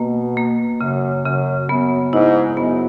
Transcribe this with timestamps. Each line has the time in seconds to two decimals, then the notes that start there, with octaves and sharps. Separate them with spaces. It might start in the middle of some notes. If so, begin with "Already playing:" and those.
Already playing: B2 A#3
0.37 A#3
0.81 F#2 C#3
1.25 F#2 C#3
1.69 F#2 B3
2.13 G#2 E4
2.57 F#2 B3